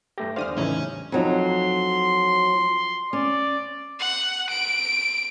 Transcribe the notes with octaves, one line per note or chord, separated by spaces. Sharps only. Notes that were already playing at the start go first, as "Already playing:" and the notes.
G2 A3 G4 A#6
E2 D3 G3 C5 D5 F5 D#6 F6
A2 C#3 E3 C#4 D#4 E4 C#5
F2 F#3 D#4 C6
C#4 D5
F#5
D7